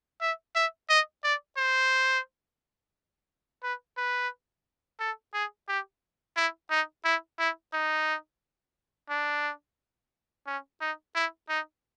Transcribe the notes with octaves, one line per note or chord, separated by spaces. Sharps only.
E5
E5
D#5
D5
C5
B4
B4
A4
G#4
G4
E4
D#4
E4
E4
D#4
D4
C#4
D#4
E4
D#4